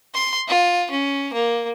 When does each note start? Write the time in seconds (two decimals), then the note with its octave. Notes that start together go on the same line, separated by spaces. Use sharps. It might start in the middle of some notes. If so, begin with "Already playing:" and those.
0.14 C6
0.48 F4
0.91 C#4
1.33 A#3